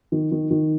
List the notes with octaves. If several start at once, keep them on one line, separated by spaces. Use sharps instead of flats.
D#3
D#3
D#3